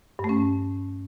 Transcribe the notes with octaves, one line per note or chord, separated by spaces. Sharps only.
G2
A3
C#4